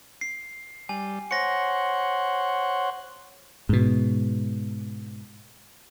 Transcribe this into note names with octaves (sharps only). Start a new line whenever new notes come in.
C7
G3 G#5
C5 C#5 F#5 A#6 C#7
G#2 B2